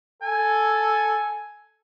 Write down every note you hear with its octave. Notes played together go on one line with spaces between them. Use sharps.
A4 G#5